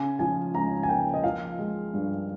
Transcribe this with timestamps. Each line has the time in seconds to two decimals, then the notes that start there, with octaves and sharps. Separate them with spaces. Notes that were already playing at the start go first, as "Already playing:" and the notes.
Already playing: C#3 G#5
0.19 F3 G#5
0.55 C#2 A#5
0.83 G#5
0.89 A#3 G5
1.14 D#5
1.24 F3 F5
1.58 G#3
1.94 G2